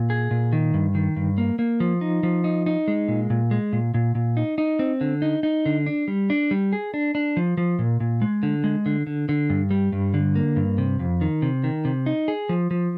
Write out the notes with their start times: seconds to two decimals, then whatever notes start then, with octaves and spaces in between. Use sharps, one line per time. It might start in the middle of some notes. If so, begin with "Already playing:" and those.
Already playing: A#2
0.10 G#4
0.31 A#2
0.53 D#3
0.74 G2
0.95 D#3
1.16 G2
1.38 A#3
1.59 A#3
1.80 F3
2.01 D#4
2.23 F3
2.44 D#4
2.66 D#4
2.88 G#3
3.08 A#2
3.30 A#2
3.51 G#3
3.73 A#2
3.94 A#2
4.15 A#2
4.37 D#4
4.58 D#4
4.79 C4
5.01 D3
5.22 D#4
5.43 D#4
5.66 D3
5.86 D4
6.08 G3
6.30 D4
6.51 G3
6.73 G#4
6.94 D4
7.15 D4
7.37 F3
7.57 F3
7.79 A#2
8.00 A#2
8.22 G#3
8.43 D3
8.64 G#3
8.86 D3
9.07 D3
9.29 D3
9.50 G2
9.71 G3
9.92 G2
10.14 D3
10.35 A#3
10.56 G2
10.78 C3
10.99 F2
11.21 D#3
11.42 C3
11.64 D#3
11.85 C3
12.06 D#4
12.28 G#4
12.49 F3
12.71 F3